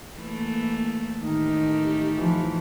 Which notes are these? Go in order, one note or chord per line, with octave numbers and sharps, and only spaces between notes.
E3 A3 A#3
A1 D#3 A3 D#4 G4
E3 F3